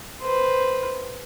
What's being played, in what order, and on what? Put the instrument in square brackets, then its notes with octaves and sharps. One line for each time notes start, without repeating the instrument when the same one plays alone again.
[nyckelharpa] B4 C5